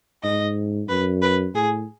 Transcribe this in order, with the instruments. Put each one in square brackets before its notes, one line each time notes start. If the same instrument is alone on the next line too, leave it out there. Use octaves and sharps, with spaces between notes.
[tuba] G#2 [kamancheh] D#5
[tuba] F#2 [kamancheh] B4
[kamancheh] B4
[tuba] A2 [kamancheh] G#4